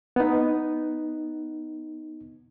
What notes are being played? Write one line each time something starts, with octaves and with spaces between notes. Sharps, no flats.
B3 D#4